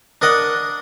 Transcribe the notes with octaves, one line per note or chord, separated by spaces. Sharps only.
D4 A#4 D#5 F#5